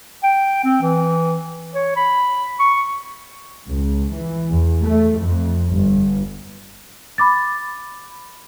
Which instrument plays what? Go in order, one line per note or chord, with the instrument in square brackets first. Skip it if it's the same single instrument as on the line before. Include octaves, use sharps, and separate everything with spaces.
[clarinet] G5
C4
E3
C#5
B5
C#6
[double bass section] C#2
E3
E2
A3
F2
G1
[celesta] B5 D6 A6